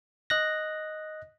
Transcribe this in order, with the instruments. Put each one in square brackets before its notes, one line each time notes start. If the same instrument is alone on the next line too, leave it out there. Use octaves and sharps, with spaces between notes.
[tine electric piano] D#5 F#6 A#6